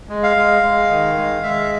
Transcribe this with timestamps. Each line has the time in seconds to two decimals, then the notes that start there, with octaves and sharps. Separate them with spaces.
0.09 G#3
0.23 F5
0.37 G#3
0.63 G#3
0.90 D#3
1.17 G#3
1.43 G#3 E5